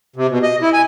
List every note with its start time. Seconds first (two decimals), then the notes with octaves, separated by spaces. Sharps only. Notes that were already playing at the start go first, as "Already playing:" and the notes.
0.16 C3
0.30 B2
0.43 D#5
0.62 E4
0.73 G#5